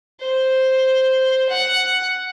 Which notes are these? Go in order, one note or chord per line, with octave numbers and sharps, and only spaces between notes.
C5
F#5